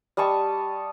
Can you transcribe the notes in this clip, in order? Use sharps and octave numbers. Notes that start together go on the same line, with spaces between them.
G3 D#5 A5 C#6